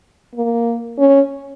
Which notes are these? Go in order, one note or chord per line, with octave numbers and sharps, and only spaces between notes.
A#3
C#4